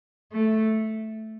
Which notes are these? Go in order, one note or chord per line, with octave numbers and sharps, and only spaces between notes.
A3